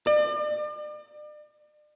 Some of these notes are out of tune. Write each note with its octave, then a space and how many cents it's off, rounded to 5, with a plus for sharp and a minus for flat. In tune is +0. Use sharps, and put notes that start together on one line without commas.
D5 +40